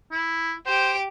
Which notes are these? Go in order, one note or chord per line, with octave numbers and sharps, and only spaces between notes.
E4
G4 C5 D7